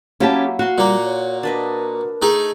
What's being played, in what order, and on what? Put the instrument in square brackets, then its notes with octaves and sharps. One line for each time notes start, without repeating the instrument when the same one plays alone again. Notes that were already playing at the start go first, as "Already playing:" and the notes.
[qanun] F#3 A#3 E4 [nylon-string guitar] C#4 G4 A5
[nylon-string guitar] F#4 [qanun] F5 C6
[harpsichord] A#2 A#3 [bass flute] G3
[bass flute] C#5
[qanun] D4 B4 D#5 [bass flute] A#4
[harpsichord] A3 D#4 G#4